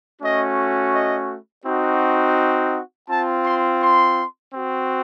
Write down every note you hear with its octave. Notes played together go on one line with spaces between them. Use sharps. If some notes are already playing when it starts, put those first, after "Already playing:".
A3 C#4 F#4 D#5
D#5
C4 D#4 F#4
C4 F4 A5
C6
C6
C4 F#4